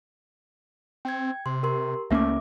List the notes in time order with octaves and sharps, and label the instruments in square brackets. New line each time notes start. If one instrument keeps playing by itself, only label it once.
[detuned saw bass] C4 [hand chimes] G5 G#6
[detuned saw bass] C3 [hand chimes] C6
[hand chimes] G4 A#4 C6
[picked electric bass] C#2 A#3 C#4 [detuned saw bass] A3 [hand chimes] E5 D6